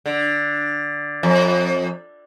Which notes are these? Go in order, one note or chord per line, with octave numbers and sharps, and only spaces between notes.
D3
F2